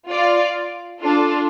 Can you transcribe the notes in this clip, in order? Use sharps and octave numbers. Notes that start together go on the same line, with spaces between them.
F4 D5 F5
D4 F4 A4